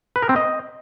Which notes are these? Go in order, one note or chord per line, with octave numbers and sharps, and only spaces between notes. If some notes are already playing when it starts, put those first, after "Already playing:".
B4
A#4
C4
D#5